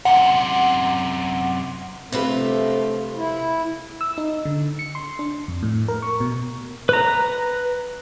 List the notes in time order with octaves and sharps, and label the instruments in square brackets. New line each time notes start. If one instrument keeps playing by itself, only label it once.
[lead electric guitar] F#2 C3 [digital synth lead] F#5
[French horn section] G2 F3 A3 [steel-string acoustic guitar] C3 F4 B4
[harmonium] E4
[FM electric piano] E6
D#4
D3
C#7
C6
D4
F2
A2
A#4
C#6
B2
[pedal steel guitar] B4 A#5